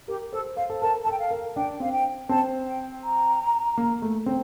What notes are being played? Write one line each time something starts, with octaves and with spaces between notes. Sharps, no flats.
G4 A#4
A4 C5
C5 F5
A4
A#4 A5
A4 A5
G5
F5
A#4
D4 G5
C4 F5
G5
C4 A5
G5
A#5
A#3
A3
C4